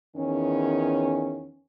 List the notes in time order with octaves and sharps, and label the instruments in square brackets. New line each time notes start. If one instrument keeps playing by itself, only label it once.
[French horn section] E2 D#3 C#4